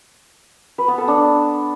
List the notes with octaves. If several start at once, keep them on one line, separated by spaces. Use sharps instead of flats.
B4
B3
A4
D4